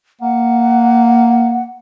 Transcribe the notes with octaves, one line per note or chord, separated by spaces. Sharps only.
A#3 F#5